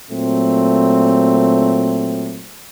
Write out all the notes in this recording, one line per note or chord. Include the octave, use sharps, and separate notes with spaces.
A#2 F#3 A3 C4